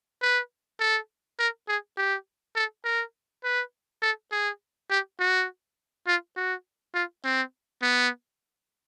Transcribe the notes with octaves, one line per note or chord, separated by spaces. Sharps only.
B4
A4
A#4
G#4
G4
A4
A#4
B4
A4
G#4
G4
F#4
F4
F#4
F4
C4
B3